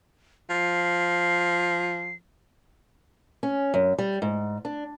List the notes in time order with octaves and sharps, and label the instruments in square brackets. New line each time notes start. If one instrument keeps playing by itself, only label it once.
[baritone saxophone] F3 [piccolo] C7
[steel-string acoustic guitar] C#4
F#2
G3
G#2
D4